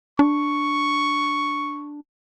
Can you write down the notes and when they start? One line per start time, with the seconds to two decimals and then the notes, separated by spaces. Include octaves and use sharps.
0.19 D4 C#6